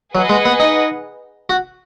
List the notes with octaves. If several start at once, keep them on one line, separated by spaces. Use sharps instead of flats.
F#3 G#4 B4 D#5 F#5
G#3
B3
D#4
F#4